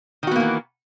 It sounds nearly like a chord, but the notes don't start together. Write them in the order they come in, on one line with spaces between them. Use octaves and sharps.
D#3 F#4 B3 A#3 E3